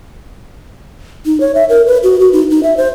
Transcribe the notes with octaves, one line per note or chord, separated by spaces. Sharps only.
D#4
C#5
E5
A#4
B4
F#4
F#4
D#4
D#4
E5
C5